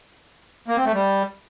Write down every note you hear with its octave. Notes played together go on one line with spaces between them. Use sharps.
A#3
C4
A3
G3